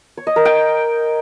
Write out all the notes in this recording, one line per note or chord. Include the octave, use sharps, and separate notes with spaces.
C#5
D#5
A#4
G5